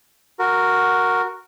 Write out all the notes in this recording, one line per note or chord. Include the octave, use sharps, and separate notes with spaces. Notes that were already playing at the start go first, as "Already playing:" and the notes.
F#4 A#4